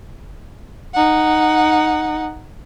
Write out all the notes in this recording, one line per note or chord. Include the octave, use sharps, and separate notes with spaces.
D#4 F#5